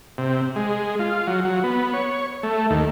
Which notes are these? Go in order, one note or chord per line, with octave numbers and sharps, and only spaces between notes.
C3
G#3
F4
F#3
F#3
B3
C#5
A3
D#2